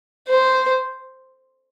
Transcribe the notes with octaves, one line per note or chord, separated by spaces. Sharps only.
C5